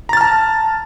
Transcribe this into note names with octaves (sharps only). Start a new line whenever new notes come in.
A5 A#5 F6 A6